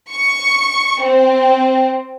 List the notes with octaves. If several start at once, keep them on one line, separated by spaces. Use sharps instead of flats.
C#6
C4